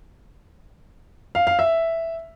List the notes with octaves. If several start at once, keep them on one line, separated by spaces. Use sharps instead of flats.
F5
F5
E5